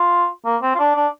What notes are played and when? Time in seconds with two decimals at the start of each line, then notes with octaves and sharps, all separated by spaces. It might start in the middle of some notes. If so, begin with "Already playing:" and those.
Already playing: F4
0.45 A#3
0.62 C4
0.75 F4
0.79 D4
0.96 D4